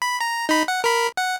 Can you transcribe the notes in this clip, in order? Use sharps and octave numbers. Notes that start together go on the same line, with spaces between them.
B5
A#5
D#4 B5
F#5
A#4 B5
F#5